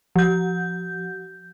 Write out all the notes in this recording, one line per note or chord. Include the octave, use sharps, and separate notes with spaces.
F3 G6